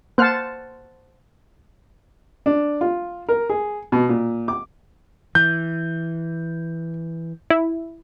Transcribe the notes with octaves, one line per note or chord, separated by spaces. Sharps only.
A#3 C5 F#5 A5 F6
D4
F4
A#4
G#4
B2
A#2
D6
E3 G6
E4